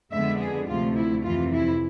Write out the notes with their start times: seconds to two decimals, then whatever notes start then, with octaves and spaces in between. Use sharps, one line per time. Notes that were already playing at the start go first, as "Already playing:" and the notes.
0.12 F2 D3 G#3 B3 D4 E5
0.41 G#4
0.67 D2 C3 F3 A3 F4
0.96 E4
1.24 F2 C3 E3 F4
1.53 E4